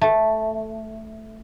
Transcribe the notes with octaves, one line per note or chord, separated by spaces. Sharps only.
A3